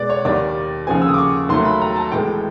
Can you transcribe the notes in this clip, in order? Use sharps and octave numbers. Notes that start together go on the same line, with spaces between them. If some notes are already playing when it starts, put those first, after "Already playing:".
Already playing: B2 G#3 B3 D5
C#5
D#2 D#3 G3 D5
D#2 C#3 F3 G#5
E6
D#6
D6
C#6
D#2 D#3 F#3 A3 C6
B5
A#5
A5
A2 E3 G#3 B3 G5